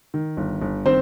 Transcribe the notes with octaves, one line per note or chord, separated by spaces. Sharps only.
D#3
G1
G1
D#3 C4 C5